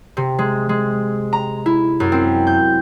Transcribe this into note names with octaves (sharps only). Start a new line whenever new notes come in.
C3
G#3
G#3
A#5
E4
F#2
C4
G6